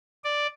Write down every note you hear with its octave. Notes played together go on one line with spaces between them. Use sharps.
D5